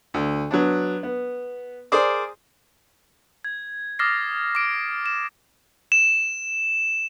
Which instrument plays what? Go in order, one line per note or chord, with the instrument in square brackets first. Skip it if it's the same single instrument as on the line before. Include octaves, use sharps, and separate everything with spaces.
[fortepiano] D2
F#3 B3 D4
B3
G#4 A#4 C5 D5 D6
[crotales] G#6
D6 D#6 F6 A6 A#6 C7
D6 D7
E7
E7